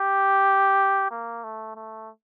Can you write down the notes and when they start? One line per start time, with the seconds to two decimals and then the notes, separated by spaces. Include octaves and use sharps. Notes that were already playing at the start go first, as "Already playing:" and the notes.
Already playing: G4
1.11 A#3
1.44 A3
1.75 A3